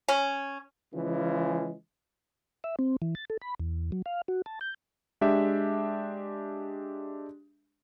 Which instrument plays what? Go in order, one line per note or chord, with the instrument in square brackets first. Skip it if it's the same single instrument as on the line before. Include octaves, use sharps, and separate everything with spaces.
[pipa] C#4
[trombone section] C#3 E3 F3 G#3
[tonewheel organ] E5
C4
E3
A6
A4
B5
E2
F#3
F5
F#4
A5
G6
[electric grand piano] G#3 D4 G4 E5